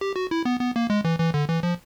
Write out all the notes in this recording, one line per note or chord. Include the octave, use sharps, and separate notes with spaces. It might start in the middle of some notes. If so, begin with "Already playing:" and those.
G4
F#4
E4
B3
B3
A#3
G#3
E3
E3
D3
E3
F3